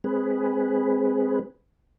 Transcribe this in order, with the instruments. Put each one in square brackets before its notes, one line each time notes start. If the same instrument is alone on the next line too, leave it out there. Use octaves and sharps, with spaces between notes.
[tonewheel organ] G#3 C4 G#4 B4